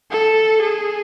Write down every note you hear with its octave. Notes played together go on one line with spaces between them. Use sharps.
A4
G#4